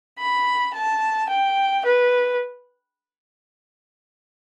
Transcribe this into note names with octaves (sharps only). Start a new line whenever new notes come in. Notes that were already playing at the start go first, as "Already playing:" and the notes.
B5
A5
G5
B4